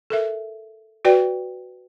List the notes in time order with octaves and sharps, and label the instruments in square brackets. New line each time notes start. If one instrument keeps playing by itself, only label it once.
[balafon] A4 A#4 E5
F#4 B4 D5 G5